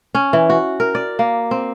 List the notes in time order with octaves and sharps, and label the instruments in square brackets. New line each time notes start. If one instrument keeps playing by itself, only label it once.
[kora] C#4
E3
F#4
A#4
D5
A#3
C4